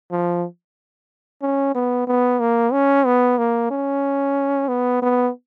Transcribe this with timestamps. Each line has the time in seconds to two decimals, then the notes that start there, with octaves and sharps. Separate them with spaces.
0.11 F3
1.42 C#4
1.75 B3
2.07 B3
2.40 A#3
2.73 C#4
3.06 B3
3.38 A#3
3.71 C#4
4.68 B3
5.02 B3